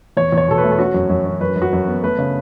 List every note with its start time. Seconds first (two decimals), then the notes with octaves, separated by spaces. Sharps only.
0.17 E2 C#5
0.32 E2
0.37 C#5
0.48 B2 A4
0.58 B4
0.64 A3
0.72 A4
0.79 C#4 F#4
0.94 F#2
1.09 F#2
1.26 C#4
1.41 F#2 B4
1.56 F#2
1.62 F#4
1.73 F#2
1.88 B3
2.03 A3 B4
2.18 C#3